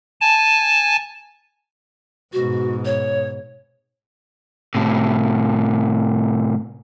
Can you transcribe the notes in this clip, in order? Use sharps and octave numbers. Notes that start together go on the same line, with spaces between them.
G#5 A5
G#2 B2 F#4
C#5
A2 C3